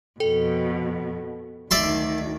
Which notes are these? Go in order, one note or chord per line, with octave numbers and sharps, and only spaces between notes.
F2 B2 A4 G5
D2 D#3 D5 E5 C6